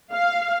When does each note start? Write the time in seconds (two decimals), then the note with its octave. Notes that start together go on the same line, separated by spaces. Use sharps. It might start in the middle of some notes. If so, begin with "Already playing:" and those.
0.13 F5